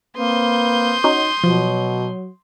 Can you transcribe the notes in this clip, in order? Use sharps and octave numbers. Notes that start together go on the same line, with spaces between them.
A#3 C4 B4 C6 D#6 G6
C#4 D#4 F#4
B2 F3 F#3